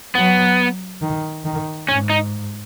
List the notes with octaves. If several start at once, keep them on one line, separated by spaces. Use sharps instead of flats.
F#3 B3
D#3
D#3
G#2 C#4
D#4